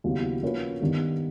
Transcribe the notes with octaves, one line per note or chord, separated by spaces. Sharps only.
D#2 C#3 F#3 B3 E4
F3 A#3 C#4 F#4 B4
G2 D#3 G3 B3 D#4